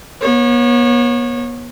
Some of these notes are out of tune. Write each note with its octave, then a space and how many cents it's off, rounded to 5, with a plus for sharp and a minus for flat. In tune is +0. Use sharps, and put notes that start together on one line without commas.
B3 -40 C#5 -25